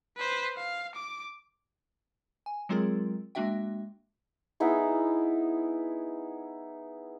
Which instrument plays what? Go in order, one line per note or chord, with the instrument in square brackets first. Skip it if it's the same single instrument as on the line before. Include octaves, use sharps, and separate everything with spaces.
[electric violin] B4 C5
F5
D6
[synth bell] G#5
F#3 G#3 C4 F4 G#4 A#4
G#3 A#3 D4 F#4 E5 G5
[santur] B3 D#4 E4 G#4